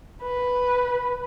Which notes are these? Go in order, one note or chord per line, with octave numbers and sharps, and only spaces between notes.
B4